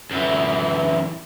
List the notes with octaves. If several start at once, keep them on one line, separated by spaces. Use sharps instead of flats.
F#2 E3